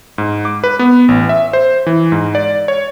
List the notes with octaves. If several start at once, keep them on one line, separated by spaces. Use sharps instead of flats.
G#2
D6
B4
B3
A1
E5
C5
E3
G#2
D5
C#5